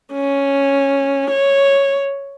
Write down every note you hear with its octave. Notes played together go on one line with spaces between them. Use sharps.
C#4
C#5